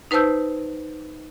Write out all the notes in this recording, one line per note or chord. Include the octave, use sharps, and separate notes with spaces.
D#4 B4 C5 A5 E6 G6